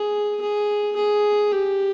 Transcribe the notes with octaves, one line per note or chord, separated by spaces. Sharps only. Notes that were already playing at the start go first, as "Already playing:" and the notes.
Already playing: G#4
G#4
G#4
G4